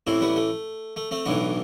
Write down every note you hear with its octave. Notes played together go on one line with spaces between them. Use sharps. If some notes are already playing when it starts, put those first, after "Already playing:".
A1 A2 E3 C4 E4
G3 B3
A3
A3
A3 C4
B1 A2 E3 B3 D4